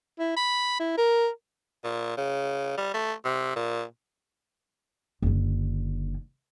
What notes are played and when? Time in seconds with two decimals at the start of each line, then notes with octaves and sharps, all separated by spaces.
0.19 E4
0.36 B5
0.80 E4
0.98 A#4
1.84 A#2
2.17 C#3
2.78 G3
2.94 A3
3.25 C3
3.56 A#2
5.22 F#1 D3